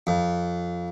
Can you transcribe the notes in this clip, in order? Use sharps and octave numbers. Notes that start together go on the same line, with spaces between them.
F2